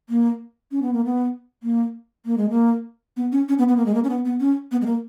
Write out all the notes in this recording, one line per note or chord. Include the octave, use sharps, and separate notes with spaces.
A#3
C#4
B3
A#3
B3
A#3
A#3
G#3
A#3
B3
C#4
C#4
B3
B3
A#3
G#3
A#3
C#4
B3
B3
C#4
B3
G#3
A#3